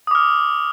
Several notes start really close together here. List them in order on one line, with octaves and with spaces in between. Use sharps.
D#6 D6 F6